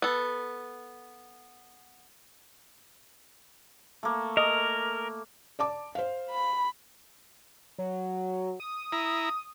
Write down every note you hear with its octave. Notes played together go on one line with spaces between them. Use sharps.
B3 A4
A3 A#3
A#4 D#5
D5 A5 D6
C5 F5
B5
F#3
D#6
E4 A#5